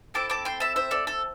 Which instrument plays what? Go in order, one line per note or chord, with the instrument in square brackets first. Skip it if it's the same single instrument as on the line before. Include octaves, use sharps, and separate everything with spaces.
[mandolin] C4 E4 A4 A5 D6
A5 D6
G5 C6
E5 A5
C5 E5
A4 D5
A4